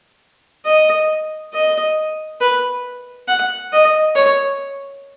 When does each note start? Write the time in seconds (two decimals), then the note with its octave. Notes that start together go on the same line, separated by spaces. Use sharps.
0.65 D#5
1.54 D#5
2.41 B4
3.28 F#5
3.73 D#5
4.16 C#5